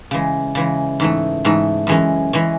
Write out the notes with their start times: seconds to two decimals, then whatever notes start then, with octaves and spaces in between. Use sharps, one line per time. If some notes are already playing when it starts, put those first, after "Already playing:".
0.11 C#3 E3 G#3
0.55 C#3 E3 G#3
1.00 G#2 E3 A3
1.45 G#2 E3 A3
1.87 F#2 E3 G#3 C#4
2.33 E3 G#3 C#4